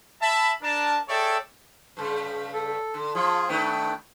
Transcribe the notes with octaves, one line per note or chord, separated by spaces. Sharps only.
E5 A5 B5
D4 A#4 A5
G#4 A4 C#5 D5 E5 G5
G2 C#3
A4
D3
F3 F4 G#4
D#3 A3 B3 D4 G5